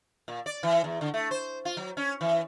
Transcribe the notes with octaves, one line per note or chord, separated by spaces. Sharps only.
A#2
D5
E3
E2
D3
A3
C5
F4
F#3
C#4
E3